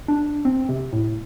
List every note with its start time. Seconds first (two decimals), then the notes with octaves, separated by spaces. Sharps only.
0.08 D4
0.45 C4
0.69 C3
0.93 A2